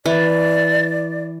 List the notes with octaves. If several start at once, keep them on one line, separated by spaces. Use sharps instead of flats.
E3 D5